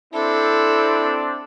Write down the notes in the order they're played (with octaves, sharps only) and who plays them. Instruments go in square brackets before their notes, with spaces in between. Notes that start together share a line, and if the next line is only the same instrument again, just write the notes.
[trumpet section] C4 D4 [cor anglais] E4 [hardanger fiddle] A4